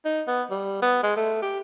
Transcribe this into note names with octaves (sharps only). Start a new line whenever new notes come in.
D#4
B3
G3
B3
G#3
A3
G4